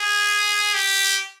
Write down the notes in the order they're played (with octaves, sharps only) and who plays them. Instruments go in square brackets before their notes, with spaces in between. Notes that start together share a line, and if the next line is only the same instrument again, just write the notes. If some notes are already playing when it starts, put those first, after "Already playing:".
Already playing: [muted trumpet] G#4
G4